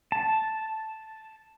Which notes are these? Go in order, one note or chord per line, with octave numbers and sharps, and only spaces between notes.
A5